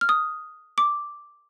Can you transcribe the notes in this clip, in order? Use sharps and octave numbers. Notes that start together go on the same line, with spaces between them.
F6
D#6
D6